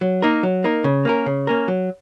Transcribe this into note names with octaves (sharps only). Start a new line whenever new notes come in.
F#3
A#3 D#4 A#4
F#3
A#3 D#4 A#4
C#3
A#3 C#4 A#4
C#3
A#3 C#4 A#4
F#3